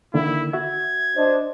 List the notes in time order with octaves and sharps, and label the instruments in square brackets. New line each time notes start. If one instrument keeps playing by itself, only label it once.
[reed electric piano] D3 D#3 A#3 [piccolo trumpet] E4
[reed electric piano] F#4 E5 [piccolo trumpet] G#6
[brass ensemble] D4 C5 D#5